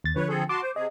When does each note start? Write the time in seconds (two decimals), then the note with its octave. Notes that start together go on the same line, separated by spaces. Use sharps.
0.04 D#2 A6
0.16 D3 F3 B4 C#5
0.29 C4 G#4 A4
0.49 F#4 A5 C6 D6
0.62 C5
0.76 C3 G#4 D#5